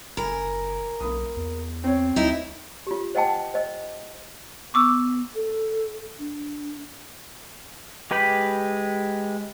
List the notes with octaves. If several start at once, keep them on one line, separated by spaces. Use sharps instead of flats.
F#1 A#4 G#5 B5
B1 A#3 B5 D#6
E2
C4 C#5
D2 D#4 E4
F4 G4
C5 D#5 F#5 G5 A5
C5 D#5
B3 C#6 D6 E6
A4
D4
G#3 G4 B4 G5 B5